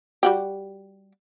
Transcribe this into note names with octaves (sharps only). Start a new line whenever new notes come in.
G3 F#4 G4